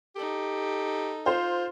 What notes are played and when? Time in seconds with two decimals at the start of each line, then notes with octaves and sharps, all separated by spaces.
0.16 D#4 G4 A4
1.26 F4 C5